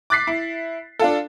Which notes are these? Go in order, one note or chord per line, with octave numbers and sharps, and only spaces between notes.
D6 F#6 A6 B6 C7
E4
D4 F4 A4